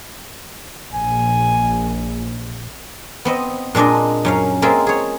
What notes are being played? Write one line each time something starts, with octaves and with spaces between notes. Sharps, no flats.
A#1 G#5
B3 C4 D#5
A#2 G#3 D4 D5 D#5
F#2 C#4 F5
G#3 A#3 C4 F4 G#4 E5
G#4 C#5